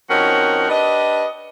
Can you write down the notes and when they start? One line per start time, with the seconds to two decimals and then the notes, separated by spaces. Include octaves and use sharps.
0.09 F3 C4 C#4 D#4 F#4 A#4
0.69 D4 G4 B4 D#5